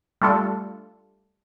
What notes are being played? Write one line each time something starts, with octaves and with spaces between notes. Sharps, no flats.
G3 A3 D4 F4 A4